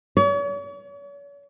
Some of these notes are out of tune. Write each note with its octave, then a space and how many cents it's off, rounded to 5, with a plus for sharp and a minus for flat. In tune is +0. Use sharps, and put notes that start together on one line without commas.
C#5 +40